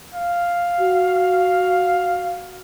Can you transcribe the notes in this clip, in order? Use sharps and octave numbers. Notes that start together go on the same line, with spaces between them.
F5
F#4